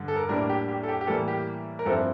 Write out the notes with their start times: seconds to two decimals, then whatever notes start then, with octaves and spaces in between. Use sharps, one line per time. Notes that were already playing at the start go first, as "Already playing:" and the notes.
Already playing: G2 D3
0.08 A4
0.16 A#4
0.29 A2 G3 A#3 D4 A#4
0.49 G4
0.69 G4
0.83 A4
0.88 G4
1.01 G4
1.07 A2 E3 G3 A#3 A4
1.28 G4
1.79 A#4
1.86 G2 F3 C4 E4 A4